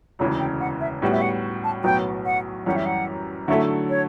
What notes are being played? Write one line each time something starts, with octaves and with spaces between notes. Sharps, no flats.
E1 D2 C#3 E3 C#5
G5
F#5
E5
A2 G3 B3 F#4
E5
F#5
A5
B1 A2 F#3 B3 G5
F#5
F#2 E3 G3 C#4 G4 F#5
E5
F#5
D3 F#3 A3 E4 A4 E5
C#5